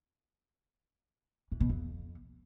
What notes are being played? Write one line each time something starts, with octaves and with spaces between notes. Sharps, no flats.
E3
B2
F2